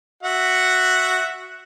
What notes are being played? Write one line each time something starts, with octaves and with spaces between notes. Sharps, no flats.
F#4 E5 F#5